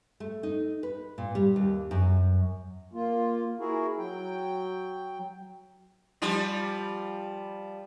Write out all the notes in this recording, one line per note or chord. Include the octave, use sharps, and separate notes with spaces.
A3
D#4
B4
A#2
G3
D#2
F#2
A#3 F4
E4 F#4 G#4 A#4
F#3 G5
F3 G3 F4